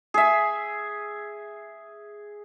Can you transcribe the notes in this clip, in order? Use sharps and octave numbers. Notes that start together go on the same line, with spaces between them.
G#4 E5